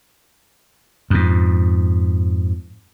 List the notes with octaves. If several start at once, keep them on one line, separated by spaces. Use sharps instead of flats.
F2 G#2